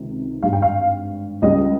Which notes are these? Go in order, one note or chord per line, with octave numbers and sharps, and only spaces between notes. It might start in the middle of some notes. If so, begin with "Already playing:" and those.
Already playing: C#2 C3 D#3
G#1 G2 G3 F5
G5
F5
C#2 C#3 G3 D#5